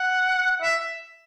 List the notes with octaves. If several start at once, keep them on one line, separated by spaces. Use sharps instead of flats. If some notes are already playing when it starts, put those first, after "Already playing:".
Already playing: F#5
E5